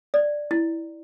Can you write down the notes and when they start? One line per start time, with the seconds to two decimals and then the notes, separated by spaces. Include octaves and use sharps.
0.14 D5
0.51 E4